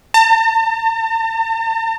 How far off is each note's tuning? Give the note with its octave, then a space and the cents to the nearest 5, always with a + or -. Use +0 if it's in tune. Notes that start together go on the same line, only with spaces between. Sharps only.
A5 +45